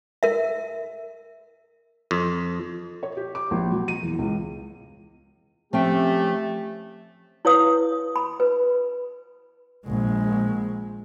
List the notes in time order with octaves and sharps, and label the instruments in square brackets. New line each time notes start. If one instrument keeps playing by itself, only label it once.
[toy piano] A#4 E5
[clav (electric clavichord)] F2
[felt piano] C#5
G4
D6
A#1
F#3
D#7
E2
C#2
[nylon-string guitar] F3 C4 G5 [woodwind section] A3 [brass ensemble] C#4 G4
[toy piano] E4 B4 C#5 F5 D#6
B5
B4
[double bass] A#1 G#3